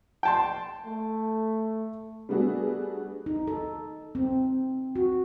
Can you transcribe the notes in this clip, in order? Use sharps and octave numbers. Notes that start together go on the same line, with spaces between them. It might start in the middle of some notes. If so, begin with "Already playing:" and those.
G5 A5 C6
A3
G3 A3 B3 D4 F#4 G#4
D#4
A4
C4
F#4